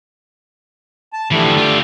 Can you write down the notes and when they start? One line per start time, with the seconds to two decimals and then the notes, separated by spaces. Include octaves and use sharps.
1.13 A5
1.31 D3 E3 F3 G3 A3
1.58 F4 G4